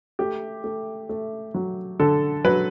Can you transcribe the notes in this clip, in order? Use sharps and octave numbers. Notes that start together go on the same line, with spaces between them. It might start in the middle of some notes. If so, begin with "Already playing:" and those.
A3 G4
A3
A3
F#3
D3 A4
F#3 B4